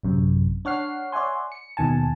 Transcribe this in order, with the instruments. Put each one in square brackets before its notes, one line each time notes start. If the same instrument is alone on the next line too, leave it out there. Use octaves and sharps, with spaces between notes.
[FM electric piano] A1 F#2 C3
D4 C#5 F#5 F6 C7
C#5 D5 E5 F#5 G#5 C6
C#7
D#2 B2 D#3 G#5 A5